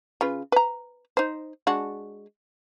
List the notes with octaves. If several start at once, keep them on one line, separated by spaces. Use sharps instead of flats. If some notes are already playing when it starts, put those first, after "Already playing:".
C#3 F4 B4
B4 A#5
D#4 C5
G#3 D4 F#4